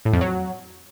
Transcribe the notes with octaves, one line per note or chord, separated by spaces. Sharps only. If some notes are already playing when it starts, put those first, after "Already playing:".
A2
F2
F#3